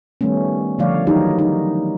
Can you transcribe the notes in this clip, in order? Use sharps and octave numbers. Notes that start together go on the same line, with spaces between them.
D#3 G3 A3 B3 C#4
D3 F3 A3 C#5 D5 F5
D#3 F#3 D#4 E4 G4
D#4